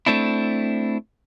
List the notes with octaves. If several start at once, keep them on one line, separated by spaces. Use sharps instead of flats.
A3 C4 D4 E4